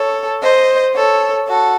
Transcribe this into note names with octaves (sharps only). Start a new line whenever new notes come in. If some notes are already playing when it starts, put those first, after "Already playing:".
Already playing: A4 C#5
C5 D#5
A4 C#5
F#4 A4